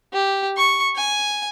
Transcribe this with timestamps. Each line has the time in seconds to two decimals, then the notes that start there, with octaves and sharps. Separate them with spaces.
0.14 G4
0.57 C#6
0.96 G#5